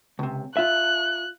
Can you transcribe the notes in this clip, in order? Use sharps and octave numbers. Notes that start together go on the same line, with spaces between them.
C#2 C3
F4 E5 F#6